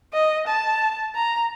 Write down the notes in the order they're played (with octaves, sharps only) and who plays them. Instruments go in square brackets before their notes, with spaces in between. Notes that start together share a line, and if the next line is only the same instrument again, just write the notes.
[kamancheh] D#5
A5
A#5